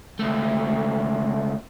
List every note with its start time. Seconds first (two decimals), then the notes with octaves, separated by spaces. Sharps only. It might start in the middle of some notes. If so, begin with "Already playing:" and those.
0.19 C#2 A3